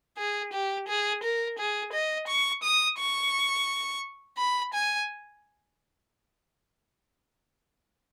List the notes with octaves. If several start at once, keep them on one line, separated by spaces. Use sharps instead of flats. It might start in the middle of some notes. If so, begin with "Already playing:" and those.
G#4
G4
G#4
A#4
G#4
D#5
C#6
D#6
C#6
B5
G#5